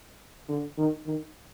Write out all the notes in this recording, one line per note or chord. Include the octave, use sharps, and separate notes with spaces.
D3
D#3
D#3